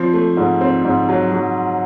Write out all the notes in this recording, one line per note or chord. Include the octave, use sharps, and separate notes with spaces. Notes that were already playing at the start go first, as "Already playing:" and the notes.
Already playing: F3 C4
A3
G#2
C4
G#2
F#3
F#3